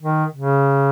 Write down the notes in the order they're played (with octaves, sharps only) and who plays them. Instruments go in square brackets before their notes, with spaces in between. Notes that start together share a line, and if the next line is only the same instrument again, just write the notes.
[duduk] D#3
C#3